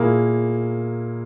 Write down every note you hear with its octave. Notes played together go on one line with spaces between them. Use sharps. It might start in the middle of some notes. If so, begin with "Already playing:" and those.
Already playing: A#2 A#3 E4 G#4